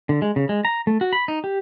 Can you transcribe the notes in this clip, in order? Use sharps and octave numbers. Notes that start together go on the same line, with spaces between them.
D3
G#3
C#3
G#3
A#5
A3
F#4
B5
D#4
G4